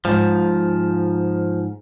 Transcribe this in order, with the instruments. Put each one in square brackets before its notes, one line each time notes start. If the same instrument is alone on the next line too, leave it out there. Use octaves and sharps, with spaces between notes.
[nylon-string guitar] G#2 [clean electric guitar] F3